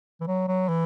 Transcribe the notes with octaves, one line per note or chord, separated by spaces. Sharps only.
E3
F#3
F#3
E3